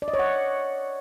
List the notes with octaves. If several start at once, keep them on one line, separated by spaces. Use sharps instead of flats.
D5
D#5
C#5
F#5